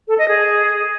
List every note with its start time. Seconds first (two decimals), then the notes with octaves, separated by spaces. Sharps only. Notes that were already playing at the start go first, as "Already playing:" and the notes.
0.08 A4
0.18 D#5
0.28 G#4